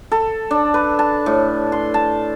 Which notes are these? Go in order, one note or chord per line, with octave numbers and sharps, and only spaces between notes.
A4
D4
B4
A5
A2
C6
A5